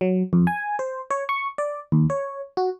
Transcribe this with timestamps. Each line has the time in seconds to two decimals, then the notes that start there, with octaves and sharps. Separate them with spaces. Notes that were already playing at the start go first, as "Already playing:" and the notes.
0.01 F#3
0.33 F2
0.47 G#5
0.79 C5
1.11 C#5
1.29 C#6
1.58 D5
1.92 D#2
2.10 C#5
2.57 F#4